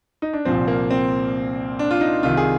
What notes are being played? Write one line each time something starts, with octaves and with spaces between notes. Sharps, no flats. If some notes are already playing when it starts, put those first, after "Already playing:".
D#4
D4
C2 A#2 F3 C4
A#3
C4
D4
F4
D#4
C2 C3 D#3 F4
G#4